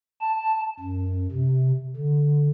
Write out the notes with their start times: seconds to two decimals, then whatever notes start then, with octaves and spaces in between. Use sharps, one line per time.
0.21 A5
0.80 F#2
1.31 C3
1.96 D3